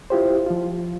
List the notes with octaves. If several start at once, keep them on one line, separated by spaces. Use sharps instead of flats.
E4 F4 G4 C5
F3 F4